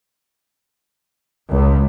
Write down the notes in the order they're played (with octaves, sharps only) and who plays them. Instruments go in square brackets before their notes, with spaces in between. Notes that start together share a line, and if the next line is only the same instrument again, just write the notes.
[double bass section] C#2